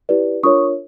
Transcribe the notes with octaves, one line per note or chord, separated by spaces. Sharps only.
E4 G4 B4 D5
D4 F4 A#4 C#5 C#6 D#6